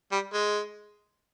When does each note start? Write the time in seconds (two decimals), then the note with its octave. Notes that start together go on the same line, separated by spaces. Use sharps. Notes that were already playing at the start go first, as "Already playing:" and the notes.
0.12 G3
0.33 G#3